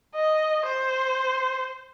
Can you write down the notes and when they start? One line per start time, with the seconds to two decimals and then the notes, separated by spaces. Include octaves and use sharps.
0.15 D#5
0.66 C5